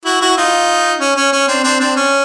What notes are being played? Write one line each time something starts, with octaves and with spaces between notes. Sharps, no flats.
E4 F#4
E4 F#4
D#4 F4
C#4
C#4
C#4
C4 D4
C4 D4
C4 D4
C#4